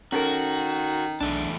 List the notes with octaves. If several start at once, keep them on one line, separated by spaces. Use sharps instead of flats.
D#3 C#4 F#4 A4 A#4
B1 E2 A3 D4 A5